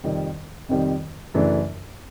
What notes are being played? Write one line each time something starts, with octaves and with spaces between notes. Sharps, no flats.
F2 C3 D#3 G3
F2 C3 D#3 G3
F#2 C#3 E3 A3 D4